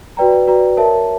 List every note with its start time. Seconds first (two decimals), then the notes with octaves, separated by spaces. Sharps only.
0.17 F#4 B4 D5 G5 A#5
0.47 F#4 B4 D5 G5 A#5
0.77 A#4 C#5 E5 A5